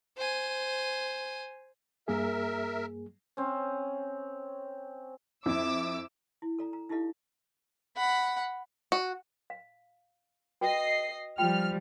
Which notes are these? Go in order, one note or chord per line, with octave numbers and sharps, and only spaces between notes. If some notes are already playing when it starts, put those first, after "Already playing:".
C5 G#5
G2 A#3 G#4 A#4 E5
C4 C#4
F2 E4 E5 D6 E6
E4
A4 D5 A#5
A#5
D#4 E4 G4 A4 D#5 F5
F#5 B5
F#4
F5
F#4 B4 D#5 G5 C7
F3 G3 F4 G5 F6